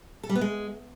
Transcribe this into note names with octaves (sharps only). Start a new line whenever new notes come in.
A4
G3
B3
G#3